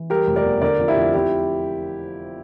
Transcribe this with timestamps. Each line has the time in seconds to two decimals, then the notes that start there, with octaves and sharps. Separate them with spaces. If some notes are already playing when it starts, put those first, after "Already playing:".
Already playing: E3
0.10 G3 G4 A#4
0.27 F1
0.36 A#4 D5
0.45 E2
0.62 D3 A#4 D5
0.79 F2
0.88 E4 G4
0.97 F2
1.14 F2 E4 G4